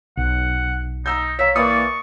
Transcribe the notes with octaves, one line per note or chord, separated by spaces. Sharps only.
B1 F#5
D#4 A#5 E6 G6
C#5 E5 F5 A#5
E3 A#3 A#4 D5 C#6 D#6